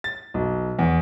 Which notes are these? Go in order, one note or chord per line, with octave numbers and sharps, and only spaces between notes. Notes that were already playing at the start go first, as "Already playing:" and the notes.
A6
B1
E2